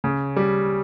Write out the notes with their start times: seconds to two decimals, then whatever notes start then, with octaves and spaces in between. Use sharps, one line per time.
0.04 C#3
0.36 G3